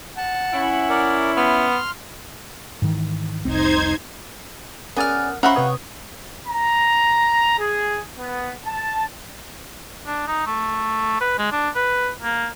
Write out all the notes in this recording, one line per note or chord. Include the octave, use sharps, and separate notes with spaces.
F#5 A5
C#4 E4
A#4 D5
B3 C6 F6
G#2 D#3 E3
F1 C2 C4 D#4 C5 G#6
B3 C#4 G#4 A#4 D5 F6
C#4 F4 A#4 C5 E5 F#5 B5 C#6
C3 B4 C#5 G5 D#6
A#5
G#4
B3
A5
D4
D#4
A3
B4
G#3
D4
B4
A#3